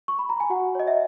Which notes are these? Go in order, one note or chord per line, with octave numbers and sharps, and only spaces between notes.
C#6
B5
A#5
G#5
F#4 F#5
C#5 D#5
E5